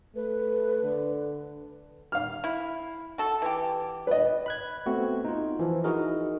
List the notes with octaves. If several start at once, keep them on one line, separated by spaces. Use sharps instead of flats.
A3 B4
D3
F5 F6
E4
F#4 A4
E3 G4
B4 D#5
B5 F#6 G#6
A3 B3 C4 F#4
D#4 F4
E3 F3
D#4 E4 F#4 G#4 A#4 D#5